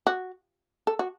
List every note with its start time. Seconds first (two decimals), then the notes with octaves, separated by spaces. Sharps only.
0.07 F#4
0.87 A4
0.99 F#4